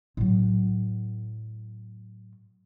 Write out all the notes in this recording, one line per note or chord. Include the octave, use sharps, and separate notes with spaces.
A2 F#3